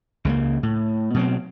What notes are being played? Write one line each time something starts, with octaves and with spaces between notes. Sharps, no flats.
C#2 C#3 A3 A#3
A2
B2 F#3 C4